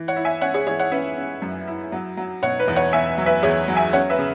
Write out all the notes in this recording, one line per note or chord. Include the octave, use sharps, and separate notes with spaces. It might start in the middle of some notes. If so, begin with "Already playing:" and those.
Already playing: E3
C#5 F#5
E4
E5 G#5
C#4 C#5 F#5
G#4 C#5
E3 G#4 C#5
C#5 F#5
C#4 B4 E5
C#4
F#2
E4
F#3
F#3
B2 C#5 F#5
B4
E2
C#5 F#5
E2 E5 G#5
F#3
B4 E5
E2 G#4 C#5
F#3
E5 G#5
C#4 C#5 F#5
B4 E5
C#3